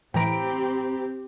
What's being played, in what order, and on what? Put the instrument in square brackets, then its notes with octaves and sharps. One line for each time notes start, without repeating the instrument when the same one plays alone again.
[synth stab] A2 E3 D7 [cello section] C4 G4 [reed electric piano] G5 A#5 B5